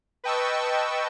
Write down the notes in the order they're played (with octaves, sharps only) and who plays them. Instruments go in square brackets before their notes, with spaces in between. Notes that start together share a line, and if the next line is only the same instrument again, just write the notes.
[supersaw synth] B4 D#5 G5 A5 C#6 E6